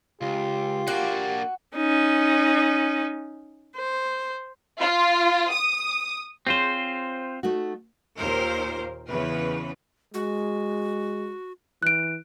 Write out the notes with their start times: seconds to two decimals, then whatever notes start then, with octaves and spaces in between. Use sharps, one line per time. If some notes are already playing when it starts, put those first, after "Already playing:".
0.21 C#2 F4 G4
0.88 A#3 D4 F#4
1.76 C#4 D#4
3.77 C5
4.82 F4
5.52 D#6
6.47 C4 F4 G#4 C5 C#5
7.43 A3 D#4 F#4
8.17 D#2 A#2 A#4 C5
9.10 E2 C#3 B4
10.14 G#3 F#4
11.83 E3 F#6 D7